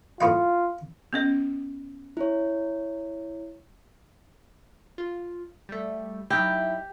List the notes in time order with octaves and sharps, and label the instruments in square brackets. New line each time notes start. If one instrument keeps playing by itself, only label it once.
[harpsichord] A2 B3 F5 [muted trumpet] F4
[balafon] B3 C#4 D#5
[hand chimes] E4 C#5
[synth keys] F4
G3 A3
[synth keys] F#3 D#4 E4 [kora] G4